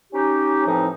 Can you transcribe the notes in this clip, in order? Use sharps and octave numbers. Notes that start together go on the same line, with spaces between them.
C#4 D#4 G4
A2 E3 F3 C4 D#4